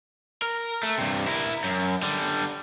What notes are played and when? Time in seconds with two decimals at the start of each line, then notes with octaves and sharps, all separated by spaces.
0.42 A#4
0.83 A3
0.97 G2 C3
1.27 E4 A#4
1.64 F#2
2.03 D3 G3